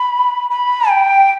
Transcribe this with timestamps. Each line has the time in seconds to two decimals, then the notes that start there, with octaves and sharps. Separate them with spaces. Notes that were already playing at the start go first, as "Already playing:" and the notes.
Already playing: B5
0.50 B5
0.89 G5